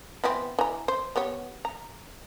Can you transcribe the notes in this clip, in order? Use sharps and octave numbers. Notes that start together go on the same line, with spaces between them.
E3 B3 C4
E3 A#5
C5
B3 G4 C#5
A#5